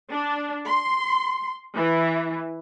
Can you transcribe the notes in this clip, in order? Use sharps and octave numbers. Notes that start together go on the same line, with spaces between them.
D4
C6
E3